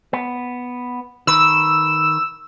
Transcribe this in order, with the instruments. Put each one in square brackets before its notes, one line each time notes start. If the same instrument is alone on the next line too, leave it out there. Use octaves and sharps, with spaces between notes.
[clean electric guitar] B3
[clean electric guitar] D#3 B4 [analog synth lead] E6